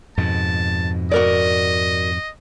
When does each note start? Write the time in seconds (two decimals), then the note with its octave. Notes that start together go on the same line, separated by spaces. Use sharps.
0.17 F2 G#2 B2 A5
1.12 F#4 A#4 D5 D#5